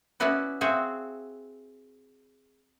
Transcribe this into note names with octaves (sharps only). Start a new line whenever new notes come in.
B3 C#4 E4 F#4 B4 D5
C4 F#4 G#4 E5 F5